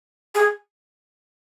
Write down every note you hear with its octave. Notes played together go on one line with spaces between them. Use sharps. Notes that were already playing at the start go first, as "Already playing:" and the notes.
G#4